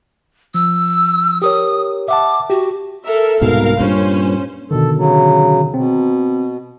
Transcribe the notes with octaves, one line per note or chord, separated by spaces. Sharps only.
F3 E6
G4 A#4 C#5 D#6
E5 F#5 A5 D6
F#4 G4
A4 A#4 E5
C2 G#2 B2 A#4 F5
G2 A#2 C#4 C5
B2 D3 D#3 A4
C#3 F#3
B2 C4